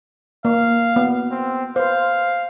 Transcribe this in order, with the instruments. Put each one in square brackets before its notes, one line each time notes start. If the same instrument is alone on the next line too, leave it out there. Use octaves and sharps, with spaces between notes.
[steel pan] A#3 [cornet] F5
[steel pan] B3
[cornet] C4
[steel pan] B4 C5 [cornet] F5